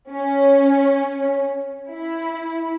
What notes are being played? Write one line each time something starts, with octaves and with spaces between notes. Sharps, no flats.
C#4
E4